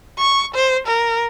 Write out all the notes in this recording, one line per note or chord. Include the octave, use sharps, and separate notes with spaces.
C#6
C5
A#4